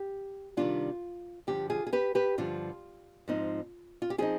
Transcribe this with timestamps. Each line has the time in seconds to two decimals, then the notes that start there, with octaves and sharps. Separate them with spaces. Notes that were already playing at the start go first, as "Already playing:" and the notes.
Already playing: G4
0.57 C3 D#3 G3 D4 F4
1.47 G2 D3 F3 G4
1.70 F4 G#4
1.87 G#4
1.93 G4 B4
2.15 G4 B4
2.38 G2 D3 F3 F4
3.28 G#2 F3 C4 D#4
4.02 F4
4.10 G4
4.18 F3 C4 D#4 F4 G#4